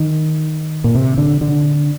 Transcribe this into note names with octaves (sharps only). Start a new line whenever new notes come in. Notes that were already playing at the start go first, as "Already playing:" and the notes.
Already playing: D#3
A#2
C3
D3
D3